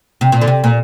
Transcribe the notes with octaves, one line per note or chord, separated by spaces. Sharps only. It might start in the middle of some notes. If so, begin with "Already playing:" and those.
C3
A#2
D3
C3
A#2